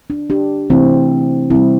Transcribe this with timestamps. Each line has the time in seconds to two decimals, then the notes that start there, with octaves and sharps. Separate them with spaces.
0.10 D4
0.30 D4 G4
0.70 C3 E3 A3 C4 E4
1.50 C3 G3 C4 E4